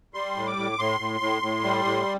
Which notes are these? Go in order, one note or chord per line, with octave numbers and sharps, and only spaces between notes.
G3 C6
A2
D6
A2
A2 C6
A2
A2
A2
G3
A2